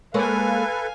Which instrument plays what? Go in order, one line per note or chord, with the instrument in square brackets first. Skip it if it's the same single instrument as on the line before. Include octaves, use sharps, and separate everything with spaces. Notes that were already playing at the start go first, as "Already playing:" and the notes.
[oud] G#3 A#3 C#5 [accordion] A4 B4 [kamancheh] F5 G#5